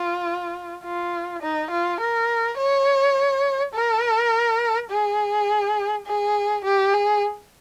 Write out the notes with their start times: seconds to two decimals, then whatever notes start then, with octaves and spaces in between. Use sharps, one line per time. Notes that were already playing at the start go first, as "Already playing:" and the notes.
Already playing: F4
0.84 F4
1.42 D#4
1.71 F4
2.00 A#4
2.58 C#5
3.74 A#4
4.90 G#4
6.06 G#4
6.65 G4
6.94 G#4